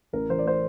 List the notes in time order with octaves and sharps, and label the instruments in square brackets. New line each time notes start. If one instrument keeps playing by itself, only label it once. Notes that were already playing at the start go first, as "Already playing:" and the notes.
[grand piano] A1 A#4
E3 C5
D5
A3 C5